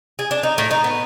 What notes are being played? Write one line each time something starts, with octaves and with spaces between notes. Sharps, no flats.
G#4
D4
D#4
A2
D#4
B3